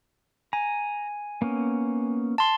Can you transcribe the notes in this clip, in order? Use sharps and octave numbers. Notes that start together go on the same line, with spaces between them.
G#5 A#5
A#3 B3 C#4
A5 C6